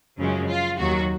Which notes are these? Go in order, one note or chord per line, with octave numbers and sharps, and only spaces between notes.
F#2 C#3 F3 G#3 C#4
F4
D#2 D#3 F#3 F#4